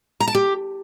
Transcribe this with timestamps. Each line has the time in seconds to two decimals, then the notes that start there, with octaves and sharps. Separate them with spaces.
0.20 A#5
0.28 A5
0.35 G4